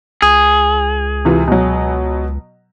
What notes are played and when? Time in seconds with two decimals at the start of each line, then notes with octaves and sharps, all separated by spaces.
0.22 C#2 G#4
1.25 C3 E3 F4
1.48 B2 F#3